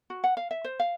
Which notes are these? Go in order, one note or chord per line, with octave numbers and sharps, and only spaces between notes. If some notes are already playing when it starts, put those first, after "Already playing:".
F#4
F#5
F5
E5
C5
F5